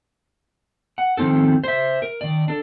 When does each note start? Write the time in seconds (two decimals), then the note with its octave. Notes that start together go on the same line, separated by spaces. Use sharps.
0.98 F#5
1.17 D#3 F3 C4 D#4 A4
1.64 C5 E5
2.02 A#4
2.21 D#3 D5
2.48 D4 A4